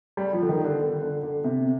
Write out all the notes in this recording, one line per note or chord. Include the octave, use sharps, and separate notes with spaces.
G3
F3
D3
D#3
D3
D3
D3
D3
C3